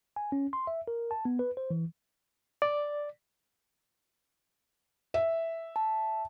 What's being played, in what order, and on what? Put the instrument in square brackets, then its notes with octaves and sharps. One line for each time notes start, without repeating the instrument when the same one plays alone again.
[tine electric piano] G#5
C#4
C6
E5
A#4
A5
B3
B4
C5
E3
[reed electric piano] D5
[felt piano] E5
[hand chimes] A5